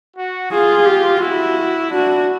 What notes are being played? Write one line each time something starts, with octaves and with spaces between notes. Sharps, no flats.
F#4
F4 G#4
G4
E4 F#4
D4 F#4